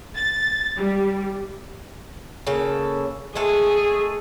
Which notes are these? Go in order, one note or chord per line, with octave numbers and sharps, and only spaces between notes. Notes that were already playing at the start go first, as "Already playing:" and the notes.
A6
G3
C#3 A#3 A4
G#3 A3 G#4 A4